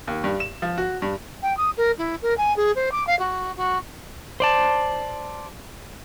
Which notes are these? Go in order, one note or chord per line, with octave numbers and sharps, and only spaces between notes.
D#2
G2
E7
F3
F#4
G2
G5
D#6
A#4
E4
A#4
G#5
G#4
C5
D6
F5
F#4
F#4
C5 D5 A5